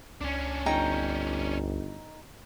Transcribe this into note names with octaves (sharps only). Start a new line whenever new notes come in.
C#2 C#4 D4
G1 D#4 G5 A#5